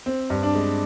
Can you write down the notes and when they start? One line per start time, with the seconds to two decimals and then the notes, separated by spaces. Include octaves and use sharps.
0.06 C4
0.30 G2
0.43 D4
0.55 G#3